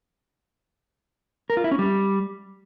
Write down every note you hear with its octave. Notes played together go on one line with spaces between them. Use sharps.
A#4
F4
E4
C#4
G3